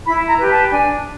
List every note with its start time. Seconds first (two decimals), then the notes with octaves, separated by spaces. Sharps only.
0.06 E4 B5
0.28 A#5
0.39 G4 B4
0.50 A5
0.71 D4 G#5